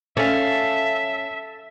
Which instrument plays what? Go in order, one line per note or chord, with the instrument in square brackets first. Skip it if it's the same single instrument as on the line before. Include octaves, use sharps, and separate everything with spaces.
[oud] C#4 [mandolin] A4 F5 [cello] E5